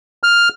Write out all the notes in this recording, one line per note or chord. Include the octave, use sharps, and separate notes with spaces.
F6